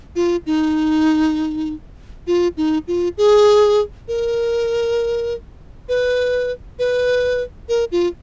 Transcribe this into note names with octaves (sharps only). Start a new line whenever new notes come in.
F4
D#4
F4
D#4
F4
G#4
A#4
B4
B4
A#4
F4